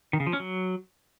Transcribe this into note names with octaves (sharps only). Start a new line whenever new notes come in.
D#3
C#3
F3
C#4
F#3